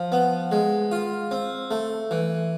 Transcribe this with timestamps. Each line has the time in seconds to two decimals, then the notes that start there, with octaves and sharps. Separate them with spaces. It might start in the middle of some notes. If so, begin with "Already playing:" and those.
Already playing: F3
0.12 B3
0.51 G#3
0.91 F4
1.31 C4
1.71 A3
2.11 E3